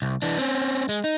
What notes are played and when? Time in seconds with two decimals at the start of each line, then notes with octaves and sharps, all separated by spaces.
0.02 C2
0.22 E3 D4
0.38 C4 C#4
0.89 G#3
1.04 D#4